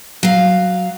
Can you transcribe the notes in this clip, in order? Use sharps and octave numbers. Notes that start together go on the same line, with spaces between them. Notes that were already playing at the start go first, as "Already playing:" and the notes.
F#3 F5